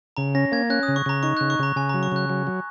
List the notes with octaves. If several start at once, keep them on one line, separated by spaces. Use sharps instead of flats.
C#3 A#5
C#4 A#6
A#3 G#6
C#4 F#6
D#6
C#3
C#6
C#3 A#5
D#4 C#6
C#3 F#6
C#6
C#3 A#5
C#3 G#5
F#3 A#5
C#6
C#3 F#6
F#3
F#3